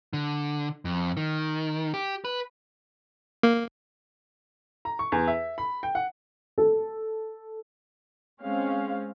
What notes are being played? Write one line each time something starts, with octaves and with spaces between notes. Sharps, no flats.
D3
F2
D#3
G4
B4
A#3
A#5
C#6
E2
E5
B5
G5
F#5
A4
G#3 C4 C#4 F5